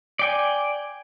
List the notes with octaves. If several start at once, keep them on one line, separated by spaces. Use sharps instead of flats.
D5 G5 G#5